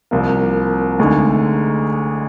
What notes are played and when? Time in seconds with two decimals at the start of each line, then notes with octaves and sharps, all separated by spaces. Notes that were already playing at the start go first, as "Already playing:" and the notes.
0.11 C2 C3 F3 A#3
0.99 D2 D3 G#3 D#4 G#4